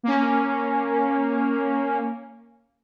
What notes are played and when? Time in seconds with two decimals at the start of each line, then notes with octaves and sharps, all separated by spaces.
0.03 A#3 C#4